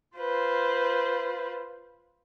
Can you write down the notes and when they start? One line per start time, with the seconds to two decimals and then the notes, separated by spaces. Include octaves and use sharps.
0.17 F4 B4 C5